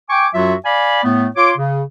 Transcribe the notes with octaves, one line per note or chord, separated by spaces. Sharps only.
G5 G#5 C#6 D6
F#2 F#3 F4 F#4 E5
D5 F5 G#5 B5
A2 A3 B3
F4 C#5 C6 D6
C#3